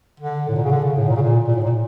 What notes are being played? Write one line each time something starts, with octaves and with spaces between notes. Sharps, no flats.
D3
A2
A#2
C#3
D3
C#3
A2
A#2
C#3
A#2
A#2
A2
A#2